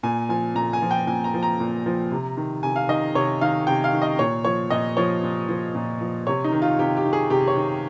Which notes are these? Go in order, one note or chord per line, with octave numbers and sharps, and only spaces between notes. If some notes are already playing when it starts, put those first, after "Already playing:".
A#2 G#5
F3 G#5
A#2 A#5
G#5
F3
G5
A#2 G#5
A#5
F3
A#5
A#2
F3
C3
D#3
C3 G#5
F5
D#3 D#5
C3 C#5
D#3 F5
C3 G5
F5
D#3
D#5
A#2 C#5
F3 C#5
A#2 D#5
F3 C#5
A#2
F3
A#2
F3
C3 C#5
D#4
D#3
F4
C3 G4
G4
D#3
G#4
C3 G4
C#5
D#3